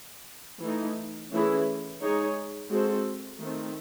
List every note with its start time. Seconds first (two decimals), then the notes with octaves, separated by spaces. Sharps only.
0.61 E3 A3 D#4
1.31 E3 A3 C#4 E4 G#4
2.01 G#3 D#4 G#4 C#5
2.70 G#3 C4 F#4 A4 C5
3.40 D#3 A3 C4